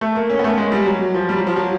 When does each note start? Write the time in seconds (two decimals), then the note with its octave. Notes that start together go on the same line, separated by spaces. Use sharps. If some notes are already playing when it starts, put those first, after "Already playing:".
0.01 A3
0.15 A#3
0.30 C#4
0.39 B3
0.44 A3
0.48 A#3
0.58 G#3
0.72 G3
0.86 F#3
1.14 F3
1.29 G3
1.38 F#3
1.47 F3
1.56 F#3